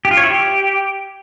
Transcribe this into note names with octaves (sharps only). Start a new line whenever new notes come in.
G4
F4
C#5
E4
G4